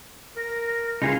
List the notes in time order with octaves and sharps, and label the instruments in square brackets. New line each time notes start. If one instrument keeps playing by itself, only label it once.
[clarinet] A#4 [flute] A#6
[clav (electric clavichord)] C#2 [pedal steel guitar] D#4 G#4 F5 [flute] C6